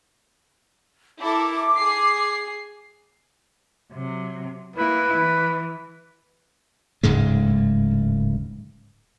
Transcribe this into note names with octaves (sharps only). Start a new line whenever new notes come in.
E4 A4 A#4 D6
G#4 C7
C3 F#3
A#3 E4 B4
E3
D1 G#2 C#3 G#3